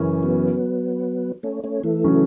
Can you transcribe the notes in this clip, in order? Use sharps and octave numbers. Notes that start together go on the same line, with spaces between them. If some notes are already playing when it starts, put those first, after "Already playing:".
Already playing: F#2 C#3 E3 C#4 E4
F#3 B3
A3 C#4
A3 C#4
E3 A3
C#3 F#3 C#4